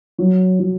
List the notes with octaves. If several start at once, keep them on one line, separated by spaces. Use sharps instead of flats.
F#3
F#3